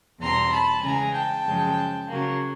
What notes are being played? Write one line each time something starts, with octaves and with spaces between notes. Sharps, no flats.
E2 B2 G3 C4 A#5 C6
A5 B5
C#3 E3 G#3 G#5 A#5
G5 A5
F#2 C#3 F3 G#3
C#3 F#3 A#3